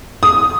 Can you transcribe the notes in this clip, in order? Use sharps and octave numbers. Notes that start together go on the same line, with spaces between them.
D#6